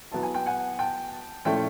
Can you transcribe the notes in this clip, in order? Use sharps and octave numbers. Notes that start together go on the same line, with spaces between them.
F#3 B3 E4 A5
G#5
G5
F#5 G#5
G5 A5
A#2 F3 A3 C#4 E4 G5 A5